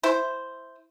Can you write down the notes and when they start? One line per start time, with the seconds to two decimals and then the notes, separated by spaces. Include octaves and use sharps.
0.03 E4 C5